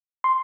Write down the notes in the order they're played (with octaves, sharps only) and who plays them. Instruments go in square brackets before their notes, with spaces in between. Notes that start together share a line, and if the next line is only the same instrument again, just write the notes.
[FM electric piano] C6